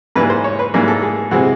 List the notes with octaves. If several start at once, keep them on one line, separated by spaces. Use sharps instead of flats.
G#2 E3 G3 A#3 B4
C5
C#5
B4
G#2 E3 G3 A#3
A4
G#4
C3 E3 G#3 C4 F#4